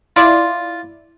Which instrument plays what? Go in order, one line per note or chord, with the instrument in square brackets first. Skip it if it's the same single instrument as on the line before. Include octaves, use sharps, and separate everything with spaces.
[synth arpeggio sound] E4 D5 [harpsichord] F4